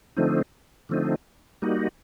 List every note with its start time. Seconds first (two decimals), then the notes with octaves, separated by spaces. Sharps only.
0.17 D3 F3 A3 C4 D#4
0.89 D3 F3 A3 C4 D#4
1.62 G3 A#3 D#4 F#4